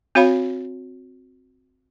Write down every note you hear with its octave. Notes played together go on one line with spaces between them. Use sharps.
C4 F#4 C#5 F5 B5